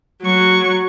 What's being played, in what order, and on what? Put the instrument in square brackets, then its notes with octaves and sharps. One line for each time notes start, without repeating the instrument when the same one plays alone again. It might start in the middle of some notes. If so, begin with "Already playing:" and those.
[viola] F#3 C#6